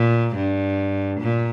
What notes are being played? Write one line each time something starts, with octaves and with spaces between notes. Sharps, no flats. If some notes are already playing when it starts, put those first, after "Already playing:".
Already playing: A#2
G2
A#2